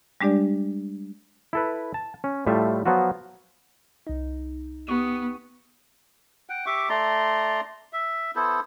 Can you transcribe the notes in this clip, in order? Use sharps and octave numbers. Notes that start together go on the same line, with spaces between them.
G3 G#3 D4 G4 D5
E4 A4 B4
A5
C#4
A2 G3 A3 F4 E5
F3 F#3 B3 F4 F#4
C2 D#4
B3 G4 C#6 D#6
F#5 G5
G4 E5 C#6 D6
A3 D5 A#5 C6
E5
B3 E4 A4 C5